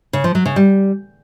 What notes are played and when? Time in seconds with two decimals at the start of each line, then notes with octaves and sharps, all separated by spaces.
0.13 C#3
0.24 F3
0.35 F#3
0.46 C#3
0.56 G3